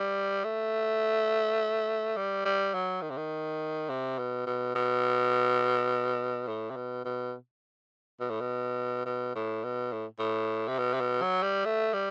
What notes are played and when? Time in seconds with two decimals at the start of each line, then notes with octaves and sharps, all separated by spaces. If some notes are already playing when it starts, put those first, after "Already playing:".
Already playing: G3
0.44 A3
2.17 G3
2.45 G3
2.74 F#3
3.02 D#3
3.10 C3
3.17 D#3
3.89 C3
4.18 B2
4.46 B2
4.75 B2
6.48 A2
6.70 C3
6.76 B2
7.05 B2
8.20 B2
8.30 A2
8.41 B2
9.06 B2
9.35 A2
9.64 B2
9.92 A2
10.19 A2
10.68 C3
10.79 B2
10.93 C3
11.01 B2
11.22 F#3
11.43 G3
11.65 A3
11.94 G3